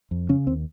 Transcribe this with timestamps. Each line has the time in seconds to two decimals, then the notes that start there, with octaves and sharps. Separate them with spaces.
0.11 F2
0.29 C#3 C#4
0.47 D#2 C4